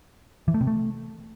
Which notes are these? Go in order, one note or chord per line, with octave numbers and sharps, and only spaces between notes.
E3
A3
C3
A3